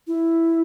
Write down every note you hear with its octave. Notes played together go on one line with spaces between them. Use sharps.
E4